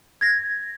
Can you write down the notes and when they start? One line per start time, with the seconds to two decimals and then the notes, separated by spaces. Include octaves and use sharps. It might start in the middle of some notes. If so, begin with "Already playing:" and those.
0.21 G#6 A#6